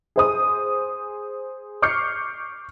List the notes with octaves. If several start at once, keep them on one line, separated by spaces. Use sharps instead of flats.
G#4 C5 D#6
C#6 D6 F6 G6 C7 C#7